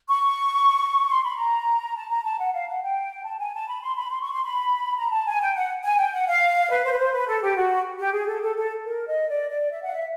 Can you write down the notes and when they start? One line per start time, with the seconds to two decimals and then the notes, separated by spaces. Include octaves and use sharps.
0.09 C#6
1.09 C6
1.23 B5
1.38 A#5
1.96 A5
2.10 A#5
2.24 A5
2.39 F#5
2.53 F5
2.68 F#5
2.82 G5
3.25 A5
3.39 G#5
3.54 A5
3.68 B5
3.82 C6
3.96 B5
4.11 C6
4.21 C#6
4.32 C6
4.44 B5
4.97 A#5
5.11 A5
5.27 G#5
5.41 G5
5.55 F#5
5.84 G#5
5.98 G5
6.13 F#5
6.27 F5
6.70 B4
6.84 C5
6.91 B4
6.98 C5
7.12 B4
7.27 A4
7.42 G4
7.55 F#4
7.99 G4
8.13 G#4
8.27 A4
8.42 A4
8.56 A4
8.85 A#4
9.07 D#5
9.28 D5
9.50 D5
9.71 E5
9.82 F#5
9.89 F5
9.93 E5